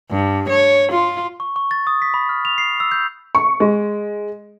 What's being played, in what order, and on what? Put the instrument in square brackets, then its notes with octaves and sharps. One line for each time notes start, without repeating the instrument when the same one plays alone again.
[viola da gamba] G2
C#5
F4
[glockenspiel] C#6
C#6
A6
D#6
B6
B5
F6
F7
C7
E6
G6
[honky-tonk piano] C#6
G#3